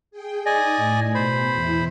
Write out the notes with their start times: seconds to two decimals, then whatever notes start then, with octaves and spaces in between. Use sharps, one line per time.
0.11 G#4 G5
0.46 D#4 D5 D#5 G#5 D#6
0.77 A2
1.15 B2 C5 B5
1.54 E2 E4